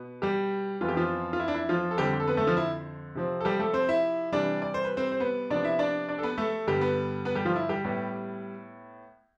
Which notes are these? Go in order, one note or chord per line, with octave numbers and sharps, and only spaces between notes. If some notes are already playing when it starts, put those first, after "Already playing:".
Already playing: B2 B3
G3 G4
F2 E3 B3 F4
G4
F3 F4
F4
E4
D4
E4
F3 F4
A4
F2 D3 G3 C4 G4
A4
B3 B4
A3 A4
F3 F4
E4
C3 F3 C4
A4
G3 G4
A3 A4
C4 C5
E4 E5
C3 E3 G3 D4 D5
D5
C5
B4
C4 C5
C5
B3 B4
C3 F3 B3 D4 D5
E4 E5
D4 D5
D4 D5
A4
B3 B4
A3 A4
G2 D3 G3 B3 G4
B3 B4
B3 B4
G3 G4
F3 F4
E4
G3 G4
A2 G3 B3